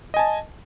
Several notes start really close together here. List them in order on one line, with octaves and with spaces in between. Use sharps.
D#5 G#5 A5